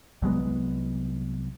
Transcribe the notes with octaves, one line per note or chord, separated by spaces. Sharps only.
C2 F#3 G#3 B3